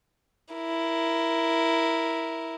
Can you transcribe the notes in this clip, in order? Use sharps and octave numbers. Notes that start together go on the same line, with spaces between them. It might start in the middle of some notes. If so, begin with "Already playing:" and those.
E4 A#4